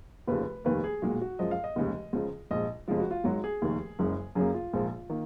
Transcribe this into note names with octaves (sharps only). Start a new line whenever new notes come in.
F1 D#2 C#3 F3 B4
F1 D#2 D#3 A#3 B4
G#4
B1 A#2 G#3 F#4
F#4
F#2 F3 G#3 D#5
F5
D#5
F1 D#2 C#3 G#3
C#2 C#3 F3
A#1 G#2 F3 D#5
F1 F2 C#3 G#3 F4
F#4
F4
G#1 G#2 F#3 F#4
G#4
F1 D#2 D#3 A#3
F#1 F#2 C#3 G#3
F#2 C#3 F#3 A#3 G#4
F4
A#1 G#2 F3 A#3
D#3 A#3